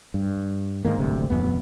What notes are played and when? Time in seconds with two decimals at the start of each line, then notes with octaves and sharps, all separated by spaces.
0.14 G2
0.85 G#2 C3 D#3 A#3
0.99 D1 G1 D2 C3
1.30 D#1 C2 F2 B3